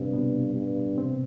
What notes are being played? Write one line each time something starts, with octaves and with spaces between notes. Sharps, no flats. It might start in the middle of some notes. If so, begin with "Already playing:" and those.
Already playing: G2 C3 C4
B2 B3
G2
C3 C4